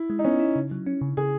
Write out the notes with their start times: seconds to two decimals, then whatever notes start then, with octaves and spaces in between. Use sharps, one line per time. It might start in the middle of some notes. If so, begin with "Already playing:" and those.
Already playing: E4
0.10 G#3
0.19 D#4
0.24 B3 C#4
0.40 E4
0.56 C#3
0.71 F#3
0.86 C#4
1.01 C#3
1.17 C#3 G#4